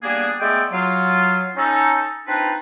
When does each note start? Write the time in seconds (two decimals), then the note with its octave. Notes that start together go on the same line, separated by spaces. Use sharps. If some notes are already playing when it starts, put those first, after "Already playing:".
0.02 G3 A#3 B3 D4 G#4
0.40 G#3 A3 B3 D5 E5 G5
0.71 F#3 F4
1.56 C#4 D#4 A4
2.27 C4 D4 D#4 F4 B4